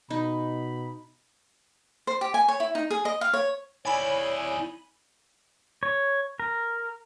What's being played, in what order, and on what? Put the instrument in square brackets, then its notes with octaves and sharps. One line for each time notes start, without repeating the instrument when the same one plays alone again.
[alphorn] B2 [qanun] D#4 [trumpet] B5
[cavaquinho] C5
G4
G#5
C#5
E4
D#4
G#4
D#5
F5
C#5
[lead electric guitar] E4 D5 [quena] C#5 [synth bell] G#5 B5
[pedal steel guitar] C#5
A#4